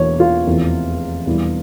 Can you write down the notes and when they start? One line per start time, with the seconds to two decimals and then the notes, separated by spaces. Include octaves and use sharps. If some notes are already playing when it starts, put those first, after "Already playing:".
Already playing: E1 E2 E3 A#3 C#5
0.20 F4
0.46 F1 E2 E3
1.26 E1 E2 E3 G3